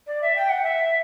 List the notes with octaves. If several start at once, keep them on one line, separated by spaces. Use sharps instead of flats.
D5
E5
G5
F#5
E5